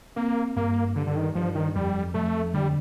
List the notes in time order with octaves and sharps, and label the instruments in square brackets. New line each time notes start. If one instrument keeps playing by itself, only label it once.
[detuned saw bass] A#3 [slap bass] C4
[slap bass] G2 [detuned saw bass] A#3
[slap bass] G2 [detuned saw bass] D3
[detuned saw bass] D3
D#3
[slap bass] G2 [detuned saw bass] F3
[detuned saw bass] D#3
[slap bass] F2 [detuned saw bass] G3
[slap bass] F2 [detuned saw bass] A3
[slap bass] D3 [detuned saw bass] G3